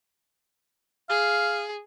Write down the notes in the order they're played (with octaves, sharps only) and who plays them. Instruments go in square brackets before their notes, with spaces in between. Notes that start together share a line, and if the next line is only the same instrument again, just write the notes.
[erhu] G#4 [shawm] F5